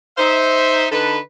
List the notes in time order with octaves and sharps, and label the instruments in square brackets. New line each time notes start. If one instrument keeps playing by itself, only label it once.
[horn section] D#4 C5 E5
D3 D#4 A4 B4